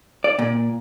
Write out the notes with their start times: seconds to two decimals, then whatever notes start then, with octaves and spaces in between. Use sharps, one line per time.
0.24 D5
0.39 A#2